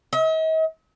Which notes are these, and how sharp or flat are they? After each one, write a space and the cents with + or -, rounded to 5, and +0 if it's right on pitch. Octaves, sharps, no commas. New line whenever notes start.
D#5 +45